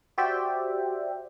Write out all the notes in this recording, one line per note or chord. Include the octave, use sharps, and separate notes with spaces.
F#4 G4 C5 D5 E5 G5